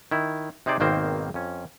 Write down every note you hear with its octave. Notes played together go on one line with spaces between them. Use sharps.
D#3 E4
C3 D#4 G#4 C5 D5
G#1 B2 D#3 A#3 C4 C5
F2 C#4